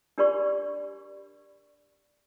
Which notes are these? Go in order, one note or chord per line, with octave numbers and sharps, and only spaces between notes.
D4 G4 A#4 D5 B5 C#6